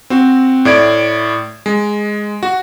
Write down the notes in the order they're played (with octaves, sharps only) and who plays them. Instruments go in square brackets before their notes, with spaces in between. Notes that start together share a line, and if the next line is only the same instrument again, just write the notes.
[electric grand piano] C4 F#4
A2 D5 G#6 D7
G#3
F#4